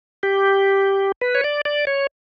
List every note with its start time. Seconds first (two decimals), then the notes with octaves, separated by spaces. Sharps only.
0.23 G4
1.21 B4
1.35 C#5
1.44 D5
1.65 D5
1.87 C#5